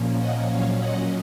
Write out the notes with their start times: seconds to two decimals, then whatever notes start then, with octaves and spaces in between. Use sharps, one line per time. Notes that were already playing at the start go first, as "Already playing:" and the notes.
Already playing: A#2 F3 A#3 C#4
0.19 D#5 F#5
0.49 A#2 F#3 C#4 C#5 F5
0.79 D#5 F#5